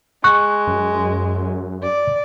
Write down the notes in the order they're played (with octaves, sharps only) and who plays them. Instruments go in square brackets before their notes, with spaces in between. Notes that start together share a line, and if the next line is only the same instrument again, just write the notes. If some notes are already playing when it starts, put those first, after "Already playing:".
[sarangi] G#3 [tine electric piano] C#6 F#6
[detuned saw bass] F#2
[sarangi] D5